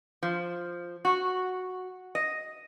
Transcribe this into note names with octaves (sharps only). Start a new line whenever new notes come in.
F3
F#4
D#5